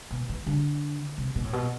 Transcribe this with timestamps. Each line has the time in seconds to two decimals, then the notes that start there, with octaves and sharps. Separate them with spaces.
0.11 B2
0.29 E3
0.47 D3
1.18 C3
1.36 B2
1.44 A2
1.53 B2